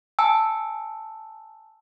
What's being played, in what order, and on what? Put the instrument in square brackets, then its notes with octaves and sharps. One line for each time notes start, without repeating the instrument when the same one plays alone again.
[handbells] G#5 A5 E6